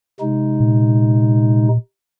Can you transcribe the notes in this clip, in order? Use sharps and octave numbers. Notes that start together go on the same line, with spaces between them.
C3 G#3 D#4
A#2